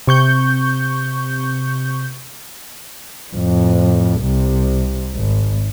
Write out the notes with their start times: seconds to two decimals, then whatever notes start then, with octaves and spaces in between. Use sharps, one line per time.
0.07 C3 C#6 G6
3.33 F2 A2
4.21 C2 C3
5.15 G#1